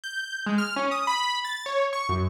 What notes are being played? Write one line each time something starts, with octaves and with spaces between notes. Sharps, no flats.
G6
G#3
F6
C#4
D#6
B5
A6
C#5
C#6
F#2